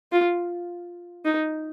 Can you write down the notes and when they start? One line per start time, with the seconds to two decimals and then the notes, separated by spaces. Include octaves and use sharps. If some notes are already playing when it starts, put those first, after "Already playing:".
0.12 F4
1.25 D#4